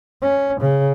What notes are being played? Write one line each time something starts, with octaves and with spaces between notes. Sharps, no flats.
C#4
C#3